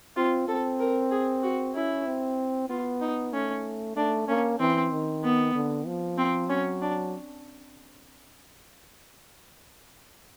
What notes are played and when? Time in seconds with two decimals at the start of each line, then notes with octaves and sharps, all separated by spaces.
0.16 C4 F4
0.48 C4 A4
0.80 A#4
1.11 G#4
1.43 F#4
1.75 C#4 E4
2.06 C4
2.69 B3 F4
3.01 D#4
3.33 A3 C#4
3.96 A3 D4
4.28 A#3 C#4
4.60 E3 C4
4.92 D#3
5.24 B3
5.55 D3
5.86 F3
6.18 C4
6.49 F#3 C#4
6.82 D4